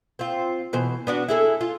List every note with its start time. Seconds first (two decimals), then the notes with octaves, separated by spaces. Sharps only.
0.19 C4 F4
0.73 B2 E3 C5
1.07 B3 D4 F#4
1.28 E4 G#4 A4
1.61 F4